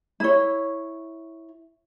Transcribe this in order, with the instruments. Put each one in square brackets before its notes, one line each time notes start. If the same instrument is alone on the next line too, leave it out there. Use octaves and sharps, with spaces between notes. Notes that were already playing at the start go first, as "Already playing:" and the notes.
[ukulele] E4 C#5